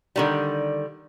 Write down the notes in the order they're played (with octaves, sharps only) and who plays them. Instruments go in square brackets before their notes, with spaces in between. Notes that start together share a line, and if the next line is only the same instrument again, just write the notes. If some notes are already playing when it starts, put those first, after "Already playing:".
[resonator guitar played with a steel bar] D3 D#3 G3